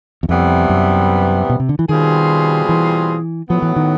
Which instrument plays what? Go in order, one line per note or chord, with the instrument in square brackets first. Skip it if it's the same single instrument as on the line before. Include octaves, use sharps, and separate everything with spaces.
[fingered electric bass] E2
[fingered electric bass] F2 [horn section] C3 E3 G3 B3
[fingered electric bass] F#2
B2
C3
D3
E3
[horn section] B2 G3 C4 F4 G#4 [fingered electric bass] D#3
[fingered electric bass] E3
[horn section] A2 F#3 B3 [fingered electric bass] F3
[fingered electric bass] E3
D#3